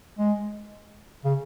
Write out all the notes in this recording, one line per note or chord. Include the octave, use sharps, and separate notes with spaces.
G#3
C#3